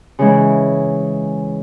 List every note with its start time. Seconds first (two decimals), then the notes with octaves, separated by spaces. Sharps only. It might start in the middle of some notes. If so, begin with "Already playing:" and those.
0.19 C#3 E3 G#3